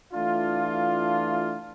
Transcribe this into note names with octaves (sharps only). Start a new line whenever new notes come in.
E3 A3 D4 F4